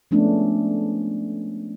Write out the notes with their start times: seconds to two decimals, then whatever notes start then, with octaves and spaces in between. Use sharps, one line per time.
0.11 F3 G#3 A3 B3 C#4 D4